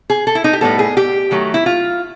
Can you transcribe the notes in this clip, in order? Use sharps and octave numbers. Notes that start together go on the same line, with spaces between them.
G#4
A4
E4
D#4
G4
A2 E3 G3 B3 A4
G#4
G4
D#3 F#3 A3
E4
F4